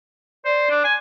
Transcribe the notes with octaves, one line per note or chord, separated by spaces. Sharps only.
C5 D5
D4
G#5